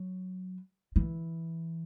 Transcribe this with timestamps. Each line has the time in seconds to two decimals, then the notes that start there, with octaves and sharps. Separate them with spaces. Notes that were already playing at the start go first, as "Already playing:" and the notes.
Already playing: F#3
0.96 E3